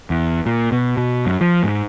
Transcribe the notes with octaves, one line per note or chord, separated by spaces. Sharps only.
E2
A#2
B2
B2
F#2
F3
G#2